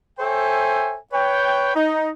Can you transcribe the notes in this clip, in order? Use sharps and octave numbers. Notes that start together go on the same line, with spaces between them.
A4 C5 C#5 E5 G5 G#5
B4 C#5 G5
D#4